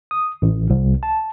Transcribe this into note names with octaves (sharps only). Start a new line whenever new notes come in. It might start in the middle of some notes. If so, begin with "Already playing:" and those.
D#6
A1
C2
A5